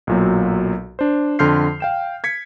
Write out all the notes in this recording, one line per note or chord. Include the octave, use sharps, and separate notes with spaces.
B1 A#2 F#3
D4 C5
F2 D3 C6 F6 G6 C7
F5 G5 E7
G#6 B6 C#7